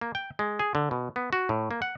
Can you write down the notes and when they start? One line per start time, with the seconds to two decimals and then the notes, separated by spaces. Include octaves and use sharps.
0.01 A#3
0.15 G5
0.39 G#3
0.59 G#4
0.75 D3
0.91 B2
1.16 B3
1.33 F#4
1.49 A2
1.71 A#3
1.82 F#5